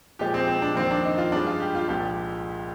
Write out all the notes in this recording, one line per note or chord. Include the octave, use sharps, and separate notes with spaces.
A#2 F3 G#3 G4
C4
C4
D4
F2 D#3 A#3 C4
D4
D#4
F4
G2 F3 G#3 D4
F4
G4
F4
C2 A#2 F3 G#3 G4